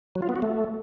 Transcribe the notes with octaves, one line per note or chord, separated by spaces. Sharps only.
F#3
F4
B3
F#4
A3